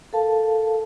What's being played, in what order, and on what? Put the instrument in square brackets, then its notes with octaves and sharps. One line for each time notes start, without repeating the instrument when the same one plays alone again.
[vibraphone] A4 A#4 F5 A5